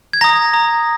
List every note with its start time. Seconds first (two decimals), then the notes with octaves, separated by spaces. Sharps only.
0.13 G#6
0.21 A#5 D#6 A#6
0.53 A#5 D#6